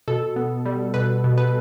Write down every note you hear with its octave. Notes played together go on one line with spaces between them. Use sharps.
B2 A4
B3
G3
B2 B4
B2
B4